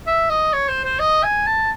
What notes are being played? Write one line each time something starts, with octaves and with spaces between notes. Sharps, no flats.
E5
D#5
C#5
C5
C5
D#5
G#5
A5